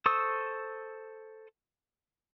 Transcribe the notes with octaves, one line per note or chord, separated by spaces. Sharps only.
A4 C5 C#6 D#6 E6